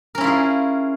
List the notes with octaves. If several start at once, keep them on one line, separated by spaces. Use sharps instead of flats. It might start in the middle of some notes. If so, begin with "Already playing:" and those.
C#4 E4 F4 G#4 A#4